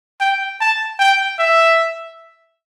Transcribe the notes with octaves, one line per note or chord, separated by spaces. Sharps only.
G5
A5
G5
E5